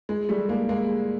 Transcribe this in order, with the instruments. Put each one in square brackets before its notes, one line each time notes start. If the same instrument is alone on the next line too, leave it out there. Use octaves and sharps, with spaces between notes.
[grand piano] G#3
G3 A3
G#3 A#3
G#3 A#3